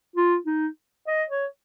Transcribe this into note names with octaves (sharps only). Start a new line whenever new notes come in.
F4
D#4
D#5
C#5